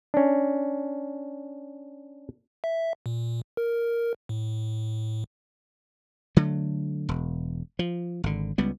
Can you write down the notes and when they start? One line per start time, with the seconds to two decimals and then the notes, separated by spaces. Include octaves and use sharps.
0.14 C#4 D4
2.64 E5
3.06 A#2
3.57 A#4
4.29 A2
6.37 D3 F#3 A3
7.09 E1
7.79 F3
8.24 G#1 D3
8.58 C#2 G3 B3